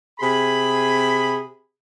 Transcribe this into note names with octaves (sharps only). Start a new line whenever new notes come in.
C3 G#4 B5